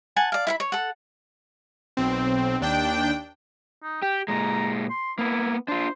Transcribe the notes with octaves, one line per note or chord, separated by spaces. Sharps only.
F#5 G#5 A5
D5 F5
E4 F5 B5
C#5
A4 F#5
B1 C4
D#2 D4 G5
D#4
G4 G5
A#2 G#3 A#5
C6
A#3 B3 E4
D4 F4 C5